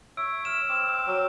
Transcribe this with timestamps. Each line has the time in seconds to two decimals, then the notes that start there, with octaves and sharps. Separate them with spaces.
0.17 C#5 E5 E6 D7
0.45 F6 E7
0.69 C4 D6
1.07 F#3